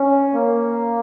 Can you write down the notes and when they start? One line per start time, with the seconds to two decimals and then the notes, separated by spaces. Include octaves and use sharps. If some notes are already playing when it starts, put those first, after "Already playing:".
Already playing: C#4
0.33 A#3